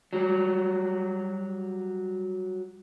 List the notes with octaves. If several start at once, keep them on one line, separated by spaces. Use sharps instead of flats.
F#3 G3